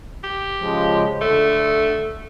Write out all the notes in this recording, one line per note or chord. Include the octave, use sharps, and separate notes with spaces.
G4
C#3 F3 G#3
D3 A3